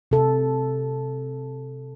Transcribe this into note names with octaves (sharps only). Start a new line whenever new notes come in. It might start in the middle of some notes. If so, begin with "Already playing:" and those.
C3 A4